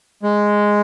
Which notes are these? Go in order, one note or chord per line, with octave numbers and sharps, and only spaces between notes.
G#3